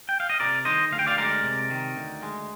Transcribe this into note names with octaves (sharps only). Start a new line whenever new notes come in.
G5
F5
D#5
C3 A#4 D5
D#3 C5 D#5
D2 F5
G5
D5 F5
G#3 A#4 D5
C3
D#3
D2
G#3